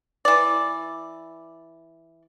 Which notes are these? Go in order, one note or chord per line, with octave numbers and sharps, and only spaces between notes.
E3 D5